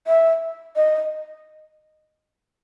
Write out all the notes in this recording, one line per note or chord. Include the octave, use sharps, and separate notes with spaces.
E5
D#5